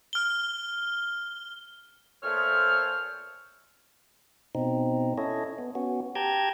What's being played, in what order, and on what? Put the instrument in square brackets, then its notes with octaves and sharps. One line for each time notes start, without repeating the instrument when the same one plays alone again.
[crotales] F6 G7
[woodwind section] A#2 A3 A4 C5 C#5 F6
[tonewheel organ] B2 C4 D#4
C#4 E4 A4 C#5 D#5
B3
B3 C#4 F#4
G4 G5 A5 A#5 G6 G#6